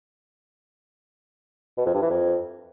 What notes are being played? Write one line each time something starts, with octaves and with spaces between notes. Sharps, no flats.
B2
F2
G2
E3
F2